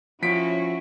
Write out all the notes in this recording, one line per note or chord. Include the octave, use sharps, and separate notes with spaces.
F3 C#4 E4 F#4 B6 D7